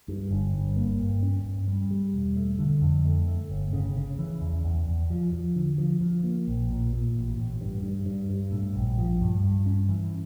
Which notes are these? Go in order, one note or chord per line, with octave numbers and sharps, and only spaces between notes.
G2
G1
G2
A#3
G2
C#4
G2
G3
G3
E1
A3
D3
F2
A3
A3
G1
C#3
C#3
E3
E2
E2
E2
F3
F3
D3
F3
F3
A#3
A#1
A#2
A#2
A1
A1
G2
G2
G2
G2
A2
A#1
F3
G2
G2
C#4
E3